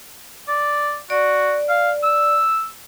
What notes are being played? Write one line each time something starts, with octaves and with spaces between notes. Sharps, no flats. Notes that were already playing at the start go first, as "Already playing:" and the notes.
D5
F#4 D5
F5
E6